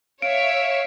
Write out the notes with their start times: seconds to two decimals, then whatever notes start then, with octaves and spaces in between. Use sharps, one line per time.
0.22 C#5 E5 F5 D7